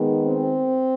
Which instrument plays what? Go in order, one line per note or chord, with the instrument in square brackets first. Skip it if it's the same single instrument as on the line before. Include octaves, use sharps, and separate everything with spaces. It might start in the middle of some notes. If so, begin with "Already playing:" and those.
Already playing: [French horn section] D#3 G#3 B3
C4